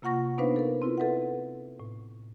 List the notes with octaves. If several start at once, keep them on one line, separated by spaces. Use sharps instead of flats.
C3 A#3 F4 F#5 C#6 A#6
B3 D4 D#4 B4 C5 F5
A4 A#4
C4 E4 F4 B4
A4 B4 E5 F#5
A2